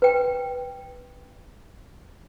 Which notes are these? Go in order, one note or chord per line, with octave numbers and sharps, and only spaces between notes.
B4 G5